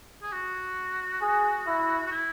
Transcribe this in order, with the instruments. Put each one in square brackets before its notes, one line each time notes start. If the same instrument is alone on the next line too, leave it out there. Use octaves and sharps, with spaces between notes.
[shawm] G#4
F#4
[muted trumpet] G#4
E4
[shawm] F#4
E4